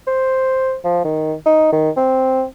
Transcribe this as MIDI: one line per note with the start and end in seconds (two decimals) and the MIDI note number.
0.07 0.76 72
0.84 1.03 53
1.04 1.34 51
1.46 1.68 63
1.72 1.90 51
1.97 2.44 60